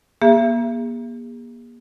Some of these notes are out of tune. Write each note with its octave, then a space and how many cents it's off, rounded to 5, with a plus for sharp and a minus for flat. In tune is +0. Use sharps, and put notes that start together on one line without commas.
A#3 +40 G#4 -35 E5 +35